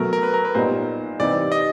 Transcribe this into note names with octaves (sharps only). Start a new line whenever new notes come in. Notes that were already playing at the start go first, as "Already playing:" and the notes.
Already playing: B2 F#3 A3 A#4
A#4
B4
A#4
B4
A#2 G3 B3 D#4 C5
C3 E3 G3 C4 D#4 D5
D#5